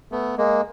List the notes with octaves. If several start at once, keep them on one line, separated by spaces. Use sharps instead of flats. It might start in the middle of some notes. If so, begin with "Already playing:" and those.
A3 B3
G#3 A#3